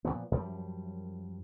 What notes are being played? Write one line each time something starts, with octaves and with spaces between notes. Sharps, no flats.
A#2 C#3 F3 B3
F#2 F3 G3